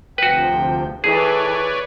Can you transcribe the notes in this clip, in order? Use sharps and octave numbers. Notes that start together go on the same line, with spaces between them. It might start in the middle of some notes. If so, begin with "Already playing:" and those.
D2 C3 F3 F#4 B4 G5
E3 G#4 A4 B4 C#5 D5